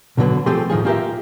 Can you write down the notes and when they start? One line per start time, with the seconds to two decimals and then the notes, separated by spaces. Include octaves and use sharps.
0.17 B1 B2 D3 F#3 B3
0.46 F3 A3 C4 G4 G#4 C6
0.70 A2 D#3 F3 G#4
0.85 A#3 F4 G4 A4 A#4 E5